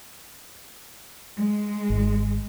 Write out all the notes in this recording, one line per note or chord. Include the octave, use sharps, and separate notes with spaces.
G#3
G#1